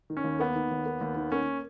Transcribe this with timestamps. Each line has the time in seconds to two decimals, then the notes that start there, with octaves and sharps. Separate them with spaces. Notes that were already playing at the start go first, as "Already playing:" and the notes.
0.10 D#3
0.17 C#4
0.24 D#2
0.39 A#3 B3
0.56 D#3
0.71 D#2
0.86 A#3
1.01 D#2
1.16 D#3
1.32 A#3 C#4